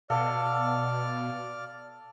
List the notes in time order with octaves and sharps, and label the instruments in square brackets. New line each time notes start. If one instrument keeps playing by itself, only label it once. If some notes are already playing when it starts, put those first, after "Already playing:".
[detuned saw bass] B2 [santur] A4 [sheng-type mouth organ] D5 F6 [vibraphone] F5